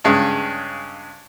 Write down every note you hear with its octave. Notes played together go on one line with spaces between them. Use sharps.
G2 C#3 G#3 C#4